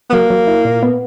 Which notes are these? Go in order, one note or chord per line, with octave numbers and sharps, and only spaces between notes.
B3
F#3 A#3
F#3
E4
A#2
B3